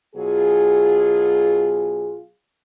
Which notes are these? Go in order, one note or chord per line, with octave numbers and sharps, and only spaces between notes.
B2 F#3 F4 G#4